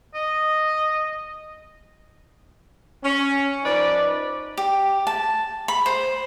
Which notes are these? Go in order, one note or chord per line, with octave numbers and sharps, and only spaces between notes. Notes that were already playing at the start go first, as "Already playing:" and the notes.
D#5
C#4
F3 D#4 B4 D5
G4
A5
B5
C5